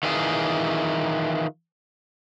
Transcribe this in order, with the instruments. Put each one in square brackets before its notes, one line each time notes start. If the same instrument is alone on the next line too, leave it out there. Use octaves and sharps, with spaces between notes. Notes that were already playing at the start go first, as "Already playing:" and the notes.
[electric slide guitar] D#3 E3 F4 G#4